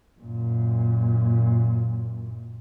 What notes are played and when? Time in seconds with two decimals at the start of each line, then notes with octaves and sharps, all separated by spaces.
0.20 F#2 A#2